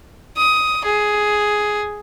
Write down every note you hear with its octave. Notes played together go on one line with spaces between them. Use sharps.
D#6
G#4